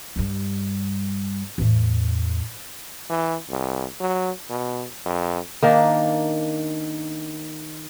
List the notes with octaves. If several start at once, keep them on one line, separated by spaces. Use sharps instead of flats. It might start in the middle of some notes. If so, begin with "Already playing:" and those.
G2 G3
E2 A2
E3
C2
F#3
B2
F2
D#3 A#3 D4